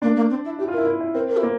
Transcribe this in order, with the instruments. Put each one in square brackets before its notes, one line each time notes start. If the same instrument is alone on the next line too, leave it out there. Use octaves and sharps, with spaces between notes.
[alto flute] A#3 [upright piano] D4
[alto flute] A#3
C4
E4
[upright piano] E4 [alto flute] G4
[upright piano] F4
[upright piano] E4 [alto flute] A#4
[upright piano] E4
E4
[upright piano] C4 [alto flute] A#4
[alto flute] A#4
E4
[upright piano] A#3